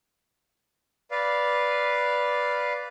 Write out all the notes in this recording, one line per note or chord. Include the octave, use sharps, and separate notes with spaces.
B4 D5 F5